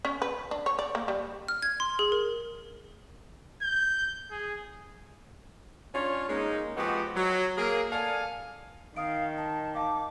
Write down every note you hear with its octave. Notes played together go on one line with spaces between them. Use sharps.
C#4
B4
D4
C#5
D5
A#3
G3
F6
G#6
C6
G#4
A#4
G6
G#4
C#4 D4 F4 C#5
G#3 A#3 C#4 D#4
F3 G#3 B3 C4 F#4 G4
F#3
A#3 G#4 A#4
A4 D5 F5 G#5
D#3 D#5 F5 D#6 D7
A5
D#5 F5 A5 D6